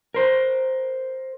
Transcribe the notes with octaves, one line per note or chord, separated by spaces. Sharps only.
A#4 C5